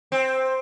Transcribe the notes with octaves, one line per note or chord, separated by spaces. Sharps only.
C4